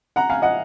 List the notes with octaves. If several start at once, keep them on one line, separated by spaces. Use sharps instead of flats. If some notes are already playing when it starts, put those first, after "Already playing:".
F#5 A#5
F5 G#5
D#5 F#5